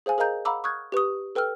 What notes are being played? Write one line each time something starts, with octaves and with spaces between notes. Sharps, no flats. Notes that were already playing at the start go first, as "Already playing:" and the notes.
G#4 C5 F5 G#5
G#4 A#4 D#5 F5 A#5 G6
F5 F#5 A#5 B5 D6 E6
C#6 D#6 F6 F#6 G#6
G4 B4 C#6 D#6
A4 B4 G5 E6 F6